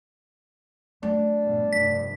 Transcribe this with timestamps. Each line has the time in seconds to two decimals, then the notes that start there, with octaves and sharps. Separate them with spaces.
1.03 F#3 A3 D4
1.41 A#1 G2 B2
1.73 F1 B1 G2 B6